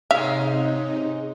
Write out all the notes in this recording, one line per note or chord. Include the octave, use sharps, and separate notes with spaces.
G#2 C3 G#3 C#4 D#4 E5 F5